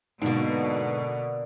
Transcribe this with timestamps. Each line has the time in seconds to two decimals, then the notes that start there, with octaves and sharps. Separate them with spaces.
0.22 G#2 B2 D3 A#3